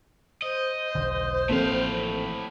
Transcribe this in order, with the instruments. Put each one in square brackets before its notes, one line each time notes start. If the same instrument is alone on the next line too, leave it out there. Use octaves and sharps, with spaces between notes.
[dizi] C5 [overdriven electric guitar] D#5
[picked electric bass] E1 B1 D3
[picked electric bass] A1 F3 [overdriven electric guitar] A2 F5 [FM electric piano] A#3 C4 A4